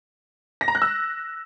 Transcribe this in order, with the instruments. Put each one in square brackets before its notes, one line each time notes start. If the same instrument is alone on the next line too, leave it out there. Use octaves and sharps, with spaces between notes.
[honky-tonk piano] A#6
A#5
F#6
E6